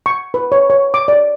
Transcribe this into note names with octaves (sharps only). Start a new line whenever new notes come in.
C#6
B4
C#5
C#5
D6
D5